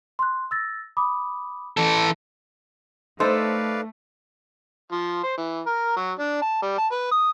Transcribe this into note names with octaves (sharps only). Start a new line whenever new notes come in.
C6 F#6
E6 A6 A#6
B5 D6 D#6
E3 A4
A3 D#4 A4 B4 C5 D5 F5
F3
C5
E3
A#4
F#3
D4
A5
G3
A5
B4
D#6